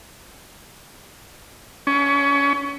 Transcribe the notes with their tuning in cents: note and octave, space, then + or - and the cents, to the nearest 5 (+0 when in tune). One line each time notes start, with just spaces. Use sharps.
C#4 +25